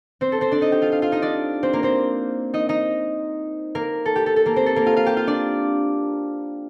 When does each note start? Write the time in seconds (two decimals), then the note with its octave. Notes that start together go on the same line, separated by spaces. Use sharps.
0.21 C4 C5
0.32 A4
0.41 C4 C5
0.52 D4 D5
0.61 D#4 D#5
0.72 G4 G5
0.82 F4 F5
0.92 F4 F5
1.02 F4 F5
1.12 D#4 D#5
1.22 D4 D5
1.63 C4 C5
1.73 A#3 A#4
1.83 C4 C5
2.54 D#4 D#5
2.69 D#4 D#5
3.75 A#3 A#4
4.05 A4
4.16 G4
4.26 A4
4.36 A4
4.46 A#3 A#4
4.56 C4 C5
4.66 A4
4.76 A#3 A#4
4.86 F4 F5
4.96 F4 F5
5.06 G4 G5
5.17 F4 F5
5.27 D4 D5